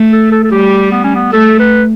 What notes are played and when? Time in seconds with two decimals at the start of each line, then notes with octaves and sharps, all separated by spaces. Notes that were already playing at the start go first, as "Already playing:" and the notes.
Already playing: A3
0.12 A4
0.32 A4
0.44 A4
0.51 G3 G4
0.92 B3
1.04 C#4
1.15 B3
1.32 A3 A4
1.59 B4